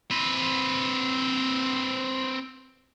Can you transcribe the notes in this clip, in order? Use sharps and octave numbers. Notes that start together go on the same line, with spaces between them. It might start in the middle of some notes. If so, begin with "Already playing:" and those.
C4 B4